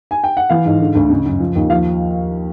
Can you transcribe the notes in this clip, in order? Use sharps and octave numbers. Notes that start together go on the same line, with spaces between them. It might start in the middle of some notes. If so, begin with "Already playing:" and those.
G#5
G5
F#5
E3 F5
G#2
D3
D2
C#3
F#2
F3
D#2
F3 F5